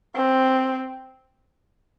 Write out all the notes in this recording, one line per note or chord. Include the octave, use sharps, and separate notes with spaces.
C4